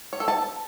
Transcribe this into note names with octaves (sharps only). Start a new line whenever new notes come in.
C#5
A4
A5